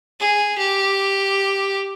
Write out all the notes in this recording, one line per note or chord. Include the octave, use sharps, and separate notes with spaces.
G#4
G4